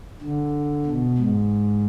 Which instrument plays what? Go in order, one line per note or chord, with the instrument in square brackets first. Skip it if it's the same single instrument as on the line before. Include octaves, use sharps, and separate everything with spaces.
[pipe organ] D3
B2
G#2